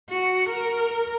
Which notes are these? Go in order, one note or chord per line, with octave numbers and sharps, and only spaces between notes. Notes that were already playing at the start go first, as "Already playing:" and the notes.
F#4
A#4